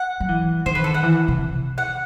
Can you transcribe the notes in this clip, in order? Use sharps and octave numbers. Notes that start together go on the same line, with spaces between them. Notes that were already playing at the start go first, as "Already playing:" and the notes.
Already playing: F#5
F#3
E3
D#3 C5
B4
A4
F#5
E3
C3
F#5